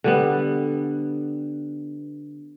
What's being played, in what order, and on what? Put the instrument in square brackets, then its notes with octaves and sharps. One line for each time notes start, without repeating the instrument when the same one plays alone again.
[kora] D3 G3 B3